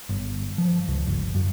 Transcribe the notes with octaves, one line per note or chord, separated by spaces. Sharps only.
G1
F3
C#2
G1
F#2